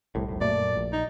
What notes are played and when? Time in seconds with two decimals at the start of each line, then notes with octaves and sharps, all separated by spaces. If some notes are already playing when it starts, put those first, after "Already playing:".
0.15 C2 A2
0.28 F1 C2 A2
0.41 F#2 A#2 A3 D5
0.76 A#1
0.93 D#4